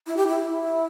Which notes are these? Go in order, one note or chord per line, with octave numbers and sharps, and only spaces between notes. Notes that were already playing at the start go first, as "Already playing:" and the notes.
E4
G4
E4